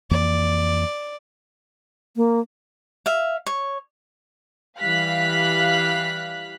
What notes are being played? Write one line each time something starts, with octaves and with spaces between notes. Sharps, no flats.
F2 E3 A#3 D5
A#3
E5 F5
C#5
E3 G3 F5 F#6 B6